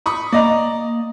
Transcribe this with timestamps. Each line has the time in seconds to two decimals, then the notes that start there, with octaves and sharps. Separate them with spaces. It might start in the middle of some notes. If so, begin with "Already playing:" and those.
0.06 B5 C#6 D#6
0.33 A#3 D5 D#5 A#5